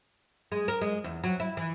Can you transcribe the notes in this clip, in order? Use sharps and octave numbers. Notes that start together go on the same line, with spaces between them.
G#3
A#4
G#3
E2
F#3
E4
E3